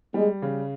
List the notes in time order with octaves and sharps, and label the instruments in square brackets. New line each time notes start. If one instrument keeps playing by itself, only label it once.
[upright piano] G3 [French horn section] G#3
[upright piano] C#3